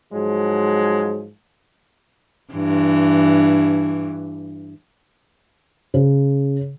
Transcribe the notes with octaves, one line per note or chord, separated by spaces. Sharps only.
G#2 F3 F#3 G#3
G2 E3
C#3